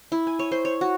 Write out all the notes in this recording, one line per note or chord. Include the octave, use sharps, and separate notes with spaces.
E4
G#5
C#5
C5
C#5
F#4